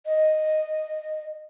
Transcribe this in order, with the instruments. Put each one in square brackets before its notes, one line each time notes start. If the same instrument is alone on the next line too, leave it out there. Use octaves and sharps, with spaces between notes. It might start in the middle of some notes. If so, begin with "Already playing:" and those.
[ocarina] D#5